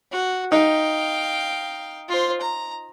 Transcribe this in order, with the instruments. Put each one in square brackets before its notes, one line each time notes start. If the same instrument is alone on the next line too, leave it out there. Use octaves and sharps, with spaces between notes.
[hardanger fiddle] F#4
[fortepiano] D#4 [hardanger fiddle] F5 G5
[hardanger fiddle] F4 C5
A#5